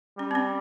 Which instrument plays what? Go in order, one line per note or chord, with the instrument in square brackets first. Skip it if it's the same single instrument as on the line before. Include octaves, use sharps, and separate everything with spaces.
[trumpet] G3 [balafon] C#4
[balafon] C4
C#4